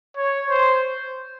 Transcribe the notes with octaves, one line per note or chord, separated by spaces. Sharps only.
C#5
C5